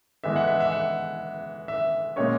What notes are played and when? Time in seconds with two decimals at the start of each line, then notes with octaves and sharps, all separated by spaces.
0.24 E3 G#3 B3 E5
0.36 F#5
0.47 E5
0.60 E5
0.72 F#5
1.68 E5
2.16 A#2 G#3 C#4 C#5